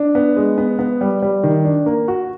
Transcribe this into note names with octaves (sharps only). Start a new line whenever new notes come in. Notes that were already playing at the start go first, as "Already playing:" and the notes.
Already playing: D4
B3
G#3
B3
B3
G3
G3
D#3
D4
A#3
F#4